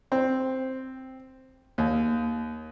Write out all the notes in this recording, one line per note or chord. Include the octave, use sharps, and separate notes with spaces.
C4
D#2